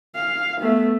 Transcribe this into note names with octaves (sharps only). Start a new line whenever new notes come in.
F5
A3 B3